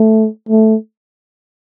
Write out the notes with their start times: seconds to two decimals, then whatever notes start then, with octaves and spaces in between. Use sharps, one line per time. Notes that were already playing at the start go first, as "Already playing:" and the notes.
Already playing: A3
0.49 A3